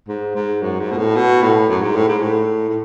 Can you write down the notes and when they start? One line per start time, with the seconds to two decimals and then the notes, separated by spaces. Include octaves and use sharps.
0.09 G#2
0.36 G#2
0.62 F#2
0.80 G#2
0.92 B2
0.98 A2
1.16 B2
1.43 A2
1.69 F#2
1.82 G#2
1.96 A2
2.09 G#2
2.22 A2
2.69 A2